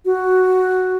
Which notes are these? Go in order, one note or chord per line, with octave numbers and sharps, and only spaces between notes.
F#4